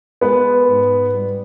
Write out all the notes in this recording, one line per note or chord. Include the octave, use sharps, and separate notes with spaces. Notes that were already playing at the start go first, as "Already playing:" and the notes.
G#3 B3 B4
G#2
G3